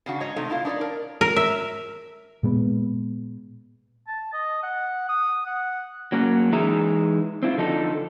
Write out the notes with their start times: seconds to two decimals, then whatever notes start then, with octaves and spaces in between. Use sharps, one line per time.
0.06 C#3 D4 F#4
0.20 G#2 C#5 D#5
0.36 C3 A3 D#4 A4
0.50 B2 E4 F4
0.65 D4 D#4 A#4 C#5 D5
0.81 A#4
1.21 A#4
1.36 E5
2.43 A#2 G#3 B3
4.08 A5
4.33 D#5
4.63 F#5
5.09 D#6
5.46 F#5
6.12 F#3 A#3 C#4
6.52 E3 G#3 D#4 G#4 E5 A#5
7.43 C4 E4 F4
7.57 D3 F3 D#4 A4